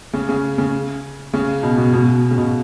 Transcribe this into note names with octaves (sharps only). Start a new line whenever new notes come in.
C#3
C#3
C#3
C#3
B2
B2
B2
C#3
B2